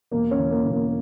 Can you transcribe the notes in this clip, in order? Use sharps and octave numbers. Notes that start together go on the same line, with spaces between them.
E1 A#3
C#4
E2
A#3
E1
A#3